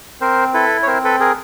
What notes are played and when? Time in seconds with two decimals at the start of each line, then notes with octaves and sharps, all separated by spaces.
0.21 C4 A#4 C5
0.54 E4 A4 B4
0.83 C#5
0.87 C4 A#4 C5
1.05 A4 B4
1.20 G#4 A#4